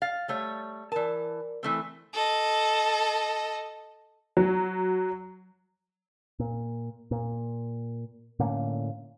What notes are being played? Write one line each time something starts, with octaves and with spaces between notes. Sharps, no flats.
F5 A6
G3 A3 C#5
E3 A#4 D5 A5
E3 A3 C4
A4 D#5
F#3
A#2
A#2
A2 D3 A#3 C#4